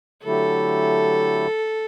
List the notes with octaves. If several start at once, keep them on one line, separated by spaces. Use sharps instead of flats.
D3 F#3 A3 E4 G4 A4